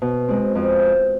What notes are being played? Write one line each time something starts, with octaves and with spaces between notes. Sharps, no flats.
B2
G#3 C4
F2